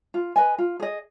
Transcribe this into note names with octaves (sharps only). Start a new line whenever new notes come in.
F4
B4 D#5 G#5
F4
G#4 D#5